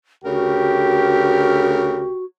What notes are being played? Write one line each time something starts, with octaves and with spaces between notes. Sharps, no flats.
D2 C#3 F#4 G4 A#4